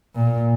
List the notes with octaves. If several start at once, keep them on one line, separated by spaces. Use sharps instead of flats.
A#2